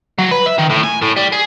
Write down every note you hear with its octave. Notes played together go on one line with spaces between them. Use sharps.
F#3
B4
E5
D#3
A2
G#5
A2
G3
G#4